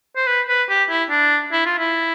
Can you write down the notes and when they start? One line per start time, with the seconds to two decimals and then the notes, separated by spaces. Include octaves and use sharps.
0.16 C5
0.27 B4
0.49 B4
0.69 G4
0.90 E4
1.10 D4
1.52 E4
1.66 F4
1.79 E4